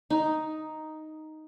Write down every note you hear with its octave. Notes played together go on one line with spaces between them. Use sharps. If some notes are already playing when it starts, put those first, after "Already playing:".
D#4